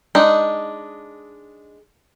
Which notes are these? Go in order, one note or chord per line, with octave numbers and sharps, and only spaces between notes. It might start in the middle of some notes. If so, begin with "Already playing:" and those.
G#3 D4 D#4